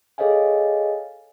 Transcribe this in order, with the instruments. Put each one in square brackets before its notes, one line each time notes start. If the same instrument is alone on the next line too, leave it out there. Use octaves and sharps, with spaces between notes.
[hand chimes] G#4 A4 C#5 D#5 F5 G#5